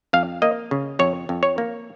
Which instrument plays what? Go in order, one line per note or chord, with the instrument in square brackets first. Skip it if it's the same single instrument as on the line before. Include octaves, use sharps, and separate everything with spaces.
[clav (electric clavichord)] F2 F5
A#3 D#5
C#3
F2 C#5
F2
C#5
A#3